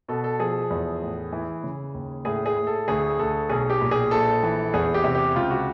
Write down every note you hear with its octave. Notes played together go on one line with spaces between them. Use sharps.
B2 A4
A4
F3 G#4
E2
A2
E3
C#3
D#2
A2 G#4
G#4
A2
A4
D2 G#4
D2 A4
B1 G#4
G4
A#2
G#4
A#1 A4
E3
E2 G#4
G4
C3
G4
C#2 F4
F#4